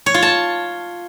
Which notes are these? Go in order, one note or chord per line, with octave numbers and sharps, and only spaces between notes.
C#5
F4
A5